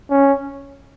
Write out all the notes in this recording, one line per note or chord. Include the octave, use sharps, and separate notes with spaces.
C#4